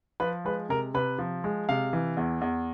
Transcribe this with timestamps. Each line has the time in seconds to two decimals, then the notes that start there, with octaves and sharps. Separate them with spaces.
0.20 F3 B4
0.45 G#3 B4
0.69 C3 A#4
0.94 C3 B4
1.19 F3
1.44 G#3
1.69 C3 F5
1.93 E3
2.17 E2
2.42 E2